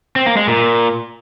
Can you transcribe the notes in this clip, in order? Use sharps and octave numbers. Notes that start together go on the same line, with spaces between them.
C4
A#3
G#3
A#2